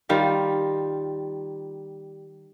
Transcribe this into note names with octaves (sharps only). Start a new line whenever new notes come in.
D#3 G3 F4